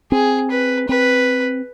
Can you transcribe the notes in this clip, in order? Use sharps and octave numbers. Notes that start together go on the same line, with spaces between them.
C4 G#4
B4
C4 B4